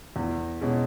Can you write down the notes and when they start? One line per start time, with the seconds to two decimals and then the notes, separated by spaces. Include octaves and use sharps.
0.16 E2
0.61 B2 G#3 C#4